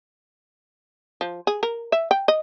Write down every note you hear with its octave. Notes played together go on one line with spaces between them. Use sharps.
F3
G#4
A#4
E5
G5
D#5